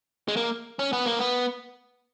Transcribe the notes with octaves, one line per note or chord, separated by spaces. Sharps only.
G#3
A#3
C#4
B3
A#3
B3